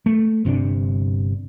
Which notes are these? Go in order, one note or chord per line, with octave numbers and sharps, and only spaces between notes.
A3
G1 C3 C4 D4